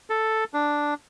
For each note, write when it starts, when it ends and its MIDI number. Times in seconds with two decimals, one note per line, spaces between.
0.10 0.44 69
0.54 0.94 62